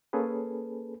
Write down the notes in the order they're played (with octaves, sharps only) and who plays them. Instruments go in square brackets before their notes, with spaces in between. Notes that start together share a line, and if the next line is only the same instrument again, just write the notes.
[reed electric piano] A#3 C#4 G#4 A4 B4